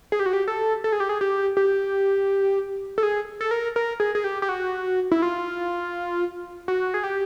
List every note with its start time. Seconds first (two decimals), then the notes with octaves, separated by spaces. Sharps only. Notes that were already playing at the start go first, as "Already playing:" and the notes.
0.12 G#4
0.20 G4
0.26 F#4
0.33 G4
0.48 A4
0.84 A4
0.92 G#4
1.00 G4
1.09 G#4
1.21 G4
1.57 G4
2.98 A4
3.03 G#4
3.41 A4
3.51 A#4
3.76 A#4
4.00 G#4
4.15 G#4
4.24 G4
4.42 G4
4.49 F#4
5.11 E4
5.22 F4
6.68 F#4
6.94 G#4
7.03 G4